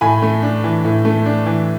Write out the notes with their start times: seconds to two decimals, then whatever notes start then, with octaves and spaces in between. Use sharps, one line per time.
0.01 A2 G#5 B5
0.22 A3
0.42 D4
0.64 E3
0.85 A2
1.05 A3
1.25 D4
1.46 E3